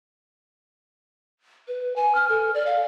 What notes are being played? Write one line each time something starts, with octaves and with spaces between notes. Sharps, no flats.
B4
G#5
F6
A4
D5
F5